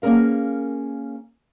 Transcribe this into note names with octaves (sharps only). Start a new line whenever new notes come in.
A#3 C#4 G#4 A#4 F5